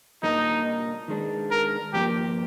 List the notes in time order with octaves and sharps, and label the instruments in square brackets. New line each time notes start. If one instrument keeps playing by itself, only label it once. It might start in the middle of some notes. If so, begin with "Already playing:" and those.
[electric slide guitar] A#2 G3 A#3 D4 [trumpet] D#4
[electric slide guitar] D#3 G#3 D4
[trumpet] A#4
[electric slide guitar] G2 F3 A#3 D4 [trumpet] G4